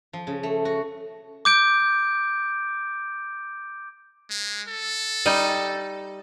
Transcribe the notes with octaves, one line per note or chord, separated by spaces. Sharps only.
F3
C#3
A3
F#4
D6 G6 D7
G#3
A4
G3 D#4 D#5